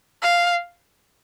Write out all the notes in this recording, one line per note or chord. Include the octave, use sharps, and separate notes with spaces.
F5